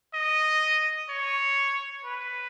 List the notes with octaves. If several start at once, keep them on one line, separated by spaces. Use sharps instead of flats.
D#5
C#5
B4